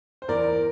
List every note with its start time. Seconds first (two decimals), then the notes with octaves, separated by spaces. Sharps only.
0.22 C5
0.28 E2 A#4 D5